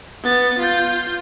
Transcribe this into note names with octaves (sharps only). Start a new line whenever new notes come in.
B3 A6
F4 G6